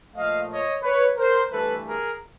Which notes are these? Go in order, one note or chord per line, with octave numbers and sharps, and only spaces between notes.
A#2 F3 A3 D#5 F5
C#5 D#5
B4 C#5
A#4 C5
G2 E3 A3 A4 B4
G#4 A#4